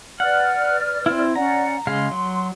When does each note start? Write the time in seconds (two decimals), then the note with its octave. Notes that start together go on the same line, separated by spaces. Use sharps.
0.20 B4 D5 F#5 F6
1.06 C4 E4
1.36 C#4 D5 F#5 A#5
1.87 C#3 G#3 F5 C6
2.11 F#3